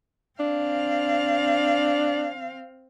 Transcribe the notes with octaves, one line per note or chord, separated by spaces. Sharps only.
C4 D4 F5